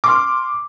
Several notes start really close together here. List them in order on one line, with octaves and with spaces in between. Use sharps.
D6 C6 F6